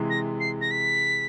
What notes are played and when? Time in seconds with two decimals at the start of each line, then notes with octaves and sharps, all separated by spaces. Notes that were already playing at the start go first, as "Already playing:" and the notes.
Already playing: C3 E3 G#3
0.10 A#6
0.40 C7
0.61 A#6
0.71 B6